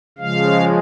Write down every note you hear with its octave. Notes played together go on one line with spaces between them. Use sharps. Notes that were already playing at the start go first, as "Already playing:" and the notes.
C#3 F3 G#3 F5